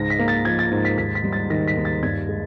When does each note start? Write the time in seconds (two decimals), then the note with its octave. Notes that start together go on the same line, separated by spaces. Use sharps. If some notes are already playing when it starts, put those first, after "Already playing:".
Already playing: C#2 G#2 A#6
0.10 B6
0.19 A#3
0.28 A6
0.45 F3 G#6
0.59 A6
0.71 G#2
0.85 B6
0.98 D#2 B6
1.15 B6
1.24 G3
1.33 A6
1.50 D#3 A#6
1.68 B6
1.77 D#2
1.85 A6
2.03 G2 G#6
2.29 G#3